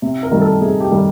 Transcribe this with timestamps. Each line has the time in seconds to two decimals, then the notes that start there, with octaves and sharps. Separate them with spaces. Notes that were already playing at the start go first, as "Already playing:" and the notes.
0.02 C3
0.23 A#4
0.31 D#3 G3
0.41 A4
0.61 C3 G#4
0.80 G4
0.91 D#3 G3